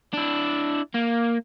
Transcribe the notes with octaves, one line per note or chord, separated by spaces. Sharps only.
D4 E4
A#3